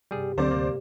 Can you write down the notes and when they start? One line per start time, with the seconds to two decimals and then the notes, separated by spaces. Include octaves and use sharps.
0.11 G2 C3 G3 B3 G#4
0.38 D2 D3 F#3 C4 C5 D5 D6
0.51 C3 A#3